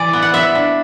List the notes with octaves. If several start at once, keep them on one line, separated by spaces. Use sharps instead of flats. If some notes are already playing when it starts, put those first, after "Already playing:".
Already playing: E3 D5
B3
F#5
B3 E5
D4